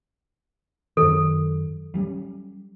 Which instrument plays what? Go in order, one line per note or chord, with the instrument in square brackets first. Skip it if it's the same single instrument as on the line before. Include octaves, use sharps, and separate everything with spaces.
[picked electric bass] F#2 D#3 [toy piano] A4
[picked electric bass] F#3 G3 C#4